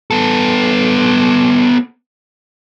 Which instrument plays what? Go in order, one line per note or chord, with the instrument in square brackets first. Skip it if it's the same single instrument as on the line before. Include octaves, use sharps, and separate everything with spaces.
[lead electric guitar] B3 A4